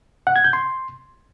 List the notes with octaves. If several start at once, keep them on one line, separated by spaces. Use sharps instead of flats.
F#5
G#6
G6
C6